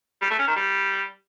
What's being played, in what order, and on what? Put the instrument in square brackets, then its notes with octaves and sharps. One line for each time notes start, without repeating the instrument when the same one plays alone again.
[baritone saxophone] G3
A3
C#4
D#3
G3